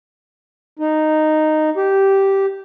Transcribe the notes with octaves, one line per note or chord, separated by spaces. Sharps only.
D#4
G4